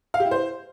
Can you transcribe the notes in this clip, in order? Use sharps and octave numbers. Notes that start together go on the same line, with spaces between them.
F5
G4
E4
C5